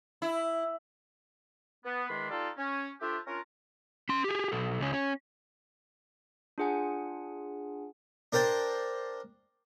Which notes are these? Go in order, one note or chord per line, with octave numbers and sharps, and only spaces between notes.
E4
B3
E2 D#3 G#3 D4 B5 C6
G3 D#4 F4 A4 D5 F5
C#4
A3 D4 F4 G4 C5 E5
C#4 D4 F4 A#4
C#4 C6
G4 G#4
B1 A4
C#2 C#4
C#4
D4 F4 G#4 F#5 G#5
D4 A#4 C5 G5 A5